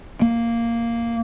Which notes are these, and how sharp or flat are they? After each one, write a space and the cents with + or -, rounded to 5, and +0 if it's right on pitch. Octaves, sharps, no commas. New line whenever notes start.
A#3 -5